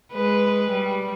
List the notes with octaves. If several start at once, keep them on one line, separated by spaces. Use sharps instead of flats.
G#3 B4
G3